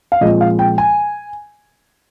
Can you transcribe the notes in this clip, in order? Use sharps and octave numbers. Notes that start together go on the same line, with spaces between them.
F5
A#2 F3 G#3 C4 D#5
F5
G5
G#5